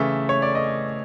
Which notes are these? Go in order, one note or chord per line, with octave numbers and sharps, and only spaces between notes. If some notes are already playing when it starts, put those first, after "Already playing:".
Already playing: C#3 E3 A3 E5
C#5
D5
D#5